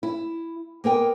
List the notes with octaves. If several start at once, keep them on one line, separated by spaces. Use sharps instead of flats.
E4
A#3 B3 A#4 G5